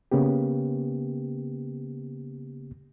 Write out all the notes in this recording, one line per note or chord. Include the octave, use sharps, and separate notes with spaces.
C#3 A#3 B3 G4